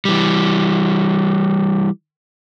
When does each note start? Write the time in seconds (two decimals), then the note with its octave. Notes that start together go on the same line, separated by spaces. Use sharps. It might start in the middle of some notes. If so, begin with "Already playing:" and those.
0.05 E3 G3